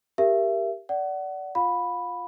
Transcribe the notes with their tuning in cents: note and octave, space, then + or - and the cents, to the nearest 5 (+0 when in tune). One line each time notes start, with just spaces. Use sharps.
G4 +0 A#4 +0 E5 +30
D5 -15 F#5 +25
F4 +10 F5 +40 B5 +0